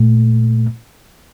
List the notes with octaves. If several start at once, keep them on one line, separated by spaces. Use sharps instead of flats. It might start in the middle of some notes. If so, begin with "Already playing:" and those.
Already playing: A#2 A3